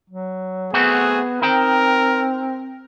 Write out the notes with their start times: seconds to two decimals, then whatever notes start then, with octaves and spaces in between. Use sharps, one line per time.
0.10 F#3
0.74 A3 B3 C4 F#4 G#4
1.42 C4 D#4 A#4 G5